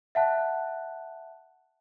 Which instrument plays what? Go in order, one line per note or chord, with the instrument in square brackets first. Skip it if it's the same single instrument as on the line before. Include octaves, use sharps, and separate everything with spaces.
[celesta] E5 F#5 A5 F#6